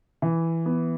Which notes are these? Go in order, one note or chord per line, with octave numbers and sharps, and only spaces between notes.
E3
B3